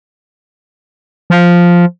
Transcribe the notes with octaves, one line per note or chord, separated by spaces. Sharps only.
F3